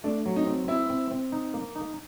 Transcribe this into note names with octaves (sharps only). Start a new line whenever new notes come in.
A3 D4
F#3
D#4
C4
C4 E4
C4
C4
D#4
A#3
D#4